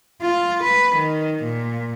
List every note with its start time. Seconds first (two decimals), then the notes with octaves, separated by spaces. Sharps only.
0.22 F4
0.64 B4
0.96 D#3
1.43 A#2